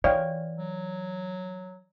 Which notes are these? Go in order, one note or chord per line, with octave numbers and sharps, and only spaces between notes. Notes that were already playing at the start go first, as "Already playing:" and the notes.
E3 C#5 D5 F5 G5
F#3